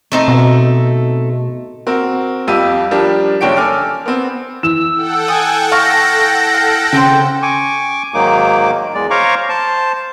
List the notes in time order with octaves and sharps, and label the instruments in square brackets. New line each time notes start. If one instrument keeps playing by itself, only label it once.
[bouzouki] A3 C4 D#4
[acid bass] B2
[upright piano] C4 F#4 A#4
F2 G3 F4 G4 E6 D#7
F3 G3 D4 G4 A#4
F#1 D4 C#5 G5 D7
A4 G#5 D6 F6
B3 C4
[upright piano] E3 E7 [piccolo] E6
[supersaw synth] A4 F#5 G5
[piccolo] G#5 [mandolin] D#6
[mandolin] F5 C#6 [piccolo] A#6
[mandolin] F5
[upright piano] C#3 [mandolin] C4 G4 C5
[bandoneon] G#5 C#6 D6
G#2 D#3 F#3 A#3 D#4 D6
E2 G#3 D5
C5 C#5 F5 A#5 C#6 D6
C5 A5